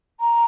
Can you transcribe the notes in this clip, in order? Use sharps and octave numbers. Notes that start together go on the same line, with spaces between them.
A#5